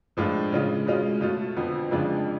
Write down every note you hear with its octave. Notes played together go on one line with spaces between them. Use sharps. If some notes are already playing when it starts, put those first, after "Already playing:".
A2 F3 G#3 D4 F4
C#3 G#3 C#4 F4
B2 G#3 C#4 F4
B2 A3 F4
F2 D3 F3 B3
F2 C#3 G#3 D4 F4